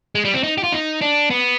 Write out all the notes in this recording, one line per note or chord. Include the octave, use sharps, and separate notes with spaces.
G#3
G3
C4
D#4
G4
F4
D#4
D4
B3